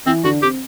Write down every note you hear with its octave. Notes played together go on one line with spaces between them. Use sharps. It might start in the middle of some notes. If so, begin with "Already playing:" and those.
E3 C4 E4
D3 D4 F#4
C4 G4